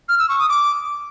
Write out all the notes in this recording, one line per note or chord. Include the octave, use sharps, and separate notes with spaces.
F6
E6
C#6
D#6
D6